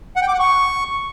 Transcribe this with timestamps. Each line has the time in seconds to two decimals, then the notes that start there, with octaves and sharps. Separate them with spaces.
0.16 F#5
0.22 G5
0.28 D6
0.34 F#5
0.40 C#6